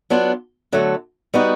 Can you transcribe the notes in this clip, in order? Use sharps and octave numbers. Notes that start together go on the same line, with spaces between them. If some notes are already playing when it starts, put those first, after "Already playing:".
F#3 B3 D4 F4
D3 F#3 A3
G3 B3 D#4 F#4